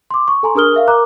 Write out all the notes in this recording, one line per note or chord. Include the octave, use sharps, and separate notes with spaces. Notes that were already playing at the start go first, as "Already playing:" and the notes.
C6 D6
C#6
A4 G#5 A#5 C6
D4 G#4 A#4 D#6 F6 G7
A#4 E5 F5
A#4 A#5 D6 F#6